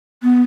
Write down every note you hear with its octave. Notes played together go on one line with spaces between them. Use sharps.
B3